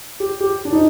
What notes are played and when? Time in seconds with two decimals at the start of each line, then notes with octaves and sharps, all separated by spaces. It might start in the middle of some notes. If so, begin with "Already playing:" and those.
0.20 G4
0.40 G4
0.65 D4
0.73 D#4